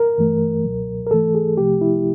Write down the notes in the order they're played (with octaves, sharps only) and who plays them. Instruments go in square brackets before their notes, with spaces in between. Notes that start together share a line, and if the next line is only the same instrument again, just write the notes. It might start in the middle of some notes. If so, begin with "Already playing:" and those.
Already playing: [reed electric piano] A#4
G2 E3 A3
C#2 B2 F#3
A#4
G#2 E3 A3 A4
G#4
C2 C3 F3 A3 G4
E4